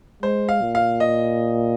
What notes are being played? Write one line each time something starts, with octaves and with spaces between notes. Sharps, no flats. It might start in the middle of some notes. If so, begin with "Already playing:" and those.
G#3 C5
F5
A#2
F5
D#5